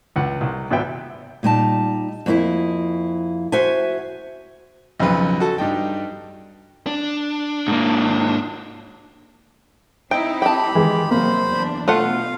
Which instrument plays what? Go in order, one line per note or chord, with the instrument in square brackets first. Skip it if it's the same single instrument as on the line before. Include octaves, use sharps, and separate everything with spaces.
[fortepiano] C#2 F#5
C2
G#1 A#2 B3 B4 E5 G5
[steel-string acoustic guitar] A#2 G3 D#4 A5
F2 A#3 C4 E4 G#4
F#4 C5 E5 G#5
[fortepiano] B1 F2 C#3 B4
F#4 A4
G2 D#4 G5
[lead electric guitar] D4
[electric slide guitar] G#2 A#3
[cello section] C4 D#4 E4 [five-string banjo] G5
[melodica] G4 B5 [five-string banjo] G5 A5
[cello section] D#3 [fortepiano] E3 G#3
[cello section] C3 F#3 G3 [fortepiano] A#3 [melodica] C5 B5
[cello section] E2 D4
[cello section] B2 [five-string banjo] A3 F4 F#5 [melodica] F5